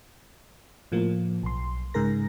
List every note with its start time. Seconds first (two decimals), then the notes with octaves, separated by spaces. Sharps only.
0.92 A2 F3 A#3
1.43 B1 C6
1.94 G#2 C#3 G#4 A#4 A#6